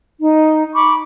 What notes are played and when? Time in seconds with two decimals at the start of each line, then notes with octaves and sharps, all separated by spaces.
0.20 D#4
0.74 B5 C#6 D6